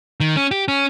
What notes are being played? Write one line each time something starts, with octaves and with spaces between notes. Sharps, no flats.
D#3
C#4
G4
C#4